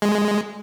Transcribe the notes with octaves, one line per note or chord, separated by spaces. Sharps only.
G#3